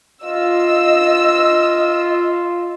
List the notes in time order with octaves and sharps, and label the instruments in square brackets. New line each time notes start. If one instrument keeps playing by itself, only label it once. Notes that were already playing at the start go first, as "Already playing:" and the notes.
[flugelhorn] F4 [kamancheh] D#5 [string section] E6